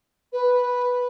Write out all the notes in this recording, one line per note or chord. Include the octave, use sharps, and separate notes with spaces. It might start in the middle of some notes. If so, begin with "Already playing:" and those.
B4